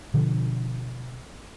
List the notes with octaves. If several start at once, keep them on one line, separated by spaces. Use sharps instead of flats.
B2 D3 F3